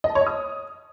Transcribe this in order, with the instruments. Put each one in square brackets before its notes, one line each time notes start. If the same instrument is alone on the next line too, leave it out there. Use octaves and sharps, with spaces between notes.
[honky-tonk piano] D#5
A5
C#5
D#5
D#6